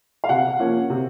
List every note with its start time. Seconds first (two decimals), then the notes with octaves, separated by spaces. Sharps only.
0.24 F5
0.29 C3 F#5
0.59 F3 A#3 C#4
0.90 C3